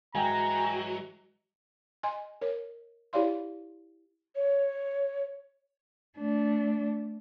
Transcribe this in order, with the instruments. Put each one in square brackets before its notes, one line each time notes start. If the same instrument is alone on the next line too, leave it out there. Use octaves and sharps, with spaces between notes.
[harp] G#2 E3 G#3 [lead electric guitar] F#3 [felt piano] G5 G#5 [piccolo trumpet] A#5
[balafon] D#5 G#5 C6
A#4 C#5
E4 G4 C#5 D5 F5 C6
[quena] C#5
[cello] A3 D4